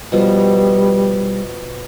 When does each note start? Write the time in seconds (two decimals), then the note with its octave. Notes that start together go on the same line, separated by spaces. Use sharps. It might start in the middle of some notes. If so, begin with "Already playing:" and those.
0.12 B2 F3 G3 B3